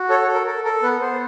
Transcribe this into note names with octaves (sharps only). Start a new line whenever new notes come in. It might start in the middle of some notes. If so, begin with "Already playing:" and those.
Already playing: F#4
A4 C#5
C#5
A4
A#4
A4 A#4
A4 A#4
B3 B4
B3 C5